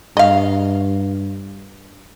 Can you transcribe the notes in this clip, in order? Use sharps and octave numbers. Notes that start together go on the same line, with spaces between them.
G2 D#5 F5